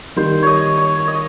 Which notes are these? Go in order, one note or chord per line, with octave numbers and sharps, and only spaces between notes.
D#3 G3 A#3 D#4 G4 C5
C#5 D#5
C#5
D#5